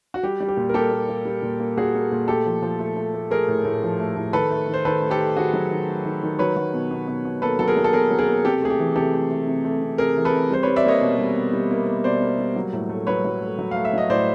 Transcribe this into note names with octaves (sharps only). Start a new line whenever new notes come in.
F#4
G3 G4
G3
G4
A#2
A#4
A#3 G4 A4
A#3
A#3
G3
A#2
A#3
A#2 F#4 G#4
A#3
A#2
A3 G4 A4
F3
F3
A3
A3
A3
A3 G#4 A#4
A2
A2
F3
A3
A2
D#3 A4 B4
A3
D#3
C5
D#3 A4 B4
A3
G4 A4
A3
D#3 F#4 G#4
F#3
D#3
A3
D#3
D#3
F#3 B4 C#5
F#3
B2
B2
B2
B2
A#3 A4 B4
F#3 A4
G#4 A#4
F#3
A4
B2 G#4 A#4
F#3
G#4 A#4
A#3
C3 G4 A4
A3 G#4
G4
E3
C3 G4 A4
A3
A3
C3
A3
C3
C3 G#4 A#4
E3
A4 B4
C3
G3 C5
B4 C#5
G3
D5 E5
A#3 C#5 D#5
B2
G3
B2
G3
A#3
A#3
B2 C5 D5
A#3
G3
F#3
A2
A3
F#3 B4 C#5
F#3
A3
F#3
A3 F5
E5
F#3 D#5
A2 C5 D5